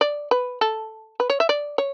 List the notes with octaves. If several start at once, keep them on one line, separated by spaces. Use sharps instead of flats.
D5
B4
A4
B4
C#5
E5
D5
C#5